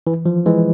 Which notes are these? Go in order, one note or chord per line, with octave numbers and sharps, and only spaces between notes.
E3
F3
E3 G#3